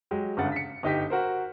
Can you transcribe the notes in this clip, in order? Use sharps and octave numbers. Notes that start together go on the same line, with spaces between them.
F#3 G#3 G4
G1 G2 C#3 G#3 F#5 A6
B6 C#7
G1 D#4 G4 B6
F#4 A#4 C5